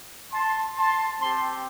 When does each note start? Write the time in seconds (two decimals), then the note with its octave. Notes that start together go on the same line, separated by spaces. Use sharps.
0.33 A5 C6
0.77 A5 C6
1.20 C4 G4 A5 C6